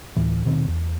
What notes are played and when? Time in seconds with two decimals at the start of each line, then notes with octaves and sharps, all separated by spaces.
0.16 D2 A2 E3
0.45 D#1 B2 D#3 C4
0.68 E2